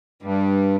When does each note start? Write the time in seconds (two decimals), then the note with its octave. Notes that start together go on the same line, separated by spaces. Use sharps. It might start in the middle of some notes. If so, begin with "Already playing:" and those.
0.23 G2 G3